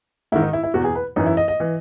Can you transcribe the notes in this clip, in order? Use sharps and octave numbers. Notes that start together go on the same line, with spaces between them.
G#2 D#3 E4
D#4
E4
E4
E2 B2 F#4
G#4
B4
F#2 E3 D#4
E4
D#5
D#5
E3